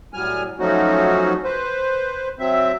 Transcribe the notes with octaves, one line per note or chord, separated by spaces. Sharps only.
A2 F#3 G3 G#5 F6
F3 F#3 A3 C#4 D#4 F#4
B4 C5
F#3 C4 E5